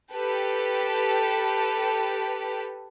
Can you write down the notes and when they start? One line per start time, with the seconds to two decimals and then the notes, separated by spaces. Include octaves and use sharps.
0.12 G4 A4 B4